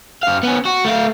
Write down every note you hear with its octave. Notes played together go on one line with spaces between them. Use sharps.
F#2 F5
B3 C#4
F#4
A3 F5